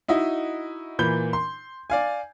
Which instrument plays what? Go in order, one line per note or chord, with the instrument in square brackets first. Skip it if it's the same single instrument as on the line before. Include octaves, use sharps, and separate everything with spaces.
[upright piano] D#4 E4 F#4 D#5
A#2 E3 B5 G6 G7
C6
D5 F5 G#5